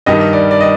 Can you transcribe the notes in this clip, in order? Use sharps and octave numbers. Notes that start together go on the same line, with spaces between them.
G2 D#3 G3 D#5
D5
D5
D#5